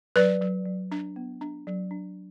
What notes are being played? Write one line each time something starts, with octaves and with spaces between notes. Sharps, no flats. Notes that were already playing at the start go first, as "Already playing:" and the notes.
F#3 B4 D5
F#3
F#3
D4
B3
D4
F#3
D4